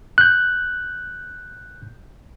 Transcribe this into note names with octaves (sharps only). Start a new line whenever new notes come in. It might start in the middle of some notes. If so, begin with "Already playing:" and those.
F#6 G6